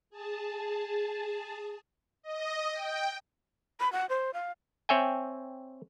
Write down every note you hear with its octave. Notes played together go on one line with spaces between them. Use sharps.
G#4 A5
D#5
G5
B5
F#5
C5
F5
C4 C#5 E5 G5 G#5